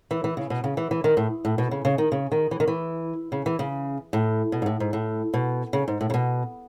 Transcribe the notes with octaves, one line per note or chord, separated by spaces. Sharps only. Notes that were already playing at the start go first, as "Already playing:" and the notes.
E3
E3
C#3
B2
C#3
E3
E3
D#3
A2
A2
B2
C#3
C#3
D#3
C#3
D#3
E3
D#3
E3
C#3
E3
C#3
A2
B2
G#2
A2
G#2
A2
B2
C#3
G#2
A2
C#3
B2